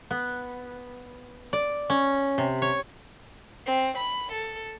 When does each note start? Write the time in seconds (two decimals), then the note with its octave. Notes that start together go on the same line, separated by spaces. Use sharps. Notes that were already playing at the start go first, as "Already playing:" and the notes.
0.11 B3
1.53 D5
1.90 C#4
2.38 C3
2.62 C#5
3.66 C4
3.97 B5
4.32 A4